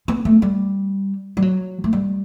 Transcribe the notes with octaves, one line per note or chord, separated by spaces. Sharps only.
B3
A3
G3
G3
F#3
A3
G3